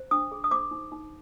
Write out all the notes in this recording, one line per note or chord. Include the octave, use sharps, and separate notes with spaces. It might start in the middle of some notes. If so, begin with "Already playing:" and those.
Already playing: C5
D4 D#6
G#4
D#6
C5 D6
D#4
D#4